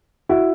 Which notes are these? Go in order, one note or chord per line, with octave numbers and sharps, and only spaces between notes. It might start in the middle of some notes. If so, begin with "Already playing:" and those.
E4 F#4